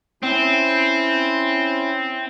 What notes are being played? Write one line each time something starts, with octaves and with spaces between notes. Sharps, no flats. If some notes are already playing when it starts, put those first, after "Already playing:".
C4 C#4 E4